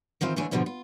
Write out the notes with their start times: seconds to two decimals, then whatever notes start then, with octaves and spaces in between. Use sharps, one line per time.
0.21 D#3 E3 C4 F4
0.36 D3 E3 A3 C#4 D4 G#5
0.51 F2 G#2 B2 D3 D#3 F3
0.66 F4